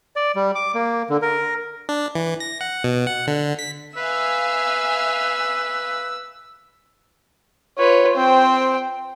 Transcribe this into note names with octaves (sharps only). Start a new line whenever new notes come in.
D5
G3
D6
A#3
D3
A#4
D4
E3
A#6
F#5
B2
F#5
D3
B6
B4 E5 F5 G#5 E6
F4 B4 C#5
C4 C5 G5